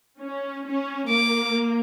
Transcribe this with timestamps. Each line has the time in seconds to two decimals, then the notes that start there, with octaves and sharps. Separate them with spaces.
0.20 C#4
0.66 C#4
1.09 A#3 D6